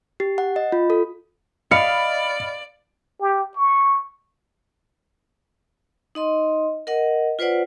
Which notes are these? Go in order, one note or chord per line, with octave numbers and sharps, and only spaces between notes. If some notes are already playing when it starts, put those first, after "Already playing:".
G4
F#5
D#5
F4
A4
D5 D#5 F5 B5 F6 C#7
G4
C#6
D#4 D#5 C6
A#4 D#5 F#5
F4 B4 C5 D5 F#5